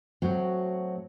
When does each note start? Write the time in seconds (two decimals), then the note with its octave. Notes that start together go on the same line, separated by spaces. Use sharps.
0.22 A2 F#3 C4 F#4